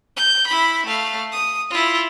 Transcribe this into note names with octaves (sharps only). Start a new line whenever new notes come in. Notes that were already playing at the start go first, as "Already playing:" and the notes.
G6
E4 B5
A3 F5
D#6
E4 F4